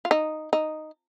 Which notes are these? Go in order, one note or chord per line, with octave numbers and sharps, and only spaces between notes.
F4
D#4
D#4